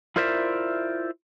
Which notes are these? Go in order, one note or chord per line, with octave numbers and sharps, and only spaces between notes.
E4 F4 A#4 C5 D5 E5